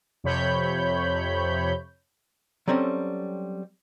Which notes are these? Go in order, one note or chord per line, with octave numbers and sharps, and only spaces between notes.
F2 C3 C#5 B5 G6
F#3 G3 C4 C#4 A4